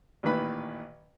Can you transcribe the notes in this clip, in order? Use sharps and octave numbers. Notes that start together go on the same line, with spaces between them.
A1 A#2 D#3 E3 B4 B5